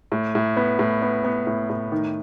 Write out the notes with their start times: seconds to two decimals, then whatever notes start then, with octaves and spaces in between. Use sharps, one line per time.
0.12 A2
0.35 A2
0.57 B3
0.79 A2
1.02 B3
1.24 B3
1.47 A2
1.70 A2
1.92 D#3